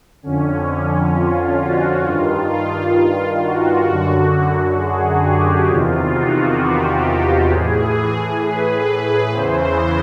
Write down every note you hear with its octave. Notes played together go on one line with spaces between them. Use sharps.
F2 D3 C#4
C#4
F4
F#4
G2 D#3 F4
F4
F#4
F#2 D3
G#4
G4
E2 C3 D#3 F4
F#4
G4
A2 E3 G#4
B4
B4
E2 C#3 E3 C5